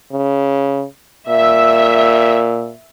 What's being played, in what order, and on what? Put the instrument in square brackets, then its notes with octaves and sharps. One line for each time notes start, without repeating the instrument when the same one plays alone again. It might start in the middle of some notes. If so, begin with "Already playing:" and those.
[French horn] C#3
[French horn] A#2 [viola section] E5